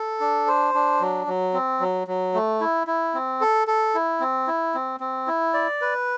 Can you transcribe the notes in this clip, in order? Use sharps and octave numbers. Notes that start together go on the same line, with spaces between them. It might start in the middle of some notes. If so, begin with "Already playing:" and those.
Already playing: A4
D4
C5
D4
F#3
F#3
C4
F#3
F#3
A3
E4
E4
C4
A4
A4
E4
C4
E4
C4
C4
E4
D5
B4